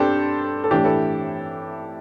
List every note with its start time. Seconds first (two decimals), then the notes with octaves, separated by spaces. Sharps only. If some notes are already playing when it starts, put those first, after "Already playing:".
Already playing: G2 C4 D4 G4 A4 C5
0.64 A4
0.71 A2 E3 D4 G4
0.84 E4 A4